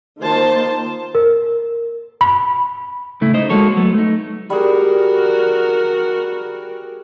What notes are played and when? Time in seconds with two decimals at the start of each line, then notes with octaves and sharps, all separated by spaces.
0.21 D#3 A#3 F4 C5 A5
1.15 A#4
2.21 B5
3.21 A2 C#3 A3 E4
3.34 D#4 C5 D#5
3.50 G#3 A#3 F#4 A4 C#5
3.77 F#3 A3 B3
3.94 A3 D#4
4.50 G3 F#4 G#4 A#4